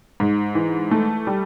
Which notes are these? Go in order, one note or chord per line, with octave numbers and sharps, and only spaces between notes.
G#2
E3
A3
G3